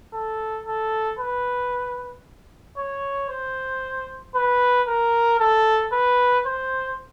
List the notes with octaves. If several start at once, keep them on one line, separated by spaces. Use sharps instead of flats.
A4
A4
B4
C#5
C5
B4
A#4
A4
B4
C5